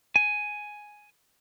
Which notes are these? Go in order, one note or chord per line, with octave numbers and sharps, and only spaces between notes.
G#5